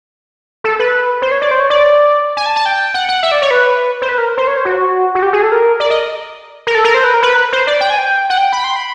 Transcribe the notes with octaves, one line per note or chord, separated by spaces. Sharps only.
A4
B4
C5
C#5
D5
C5
C#5
D5
G#5
A5
A5
G5
F#5
F#5
E5
D5
C#5
B4
C5
B4
A#4
C5
C#5
C5
F#4
F#4
G4
G#4
A4
A#4
D5
D#5
A#4
A4
A#4
C5
B4
A#4
B4
C5
D5
G5
G#5
G5
F#5
G5
B5
C6
B5